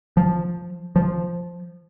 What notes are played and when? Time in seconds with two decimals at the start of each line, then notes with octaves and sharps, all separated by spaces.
0.17 F3
0.96 F3